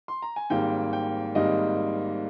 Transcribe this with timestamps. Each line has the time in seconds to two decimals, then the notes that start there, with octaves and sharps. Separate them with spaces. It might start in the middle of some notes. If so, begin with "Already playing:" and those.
0.08 C6
0.22 A#5
0.36 G#5
0.50 G#1 G#2 G3 A#3 G5
0.93 G5
1.35 G#1 G#2 G3 A#3 D#5